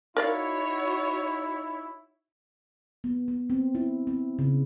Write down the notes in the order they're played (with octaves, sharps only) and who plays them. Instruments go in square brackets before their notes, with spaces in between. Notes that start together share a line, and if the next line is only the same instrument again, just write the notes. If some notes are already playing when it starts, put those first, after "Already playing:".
[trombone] D#4 [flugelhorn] E4 [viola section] F#4 C#5 [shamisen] A#4 D5 F5
[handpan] B3
B3
C4
E4
C4
C#3